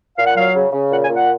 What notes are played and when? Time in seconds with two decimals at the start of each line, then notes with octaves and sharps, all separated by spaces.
0.17 A#2 F5
0.27 F#5
0.37 F#3 F5
0.55 C#3
0.72 C#3
0.91 A#2 F#5
1.03 G#5
1.09 A#2
1.16 F#5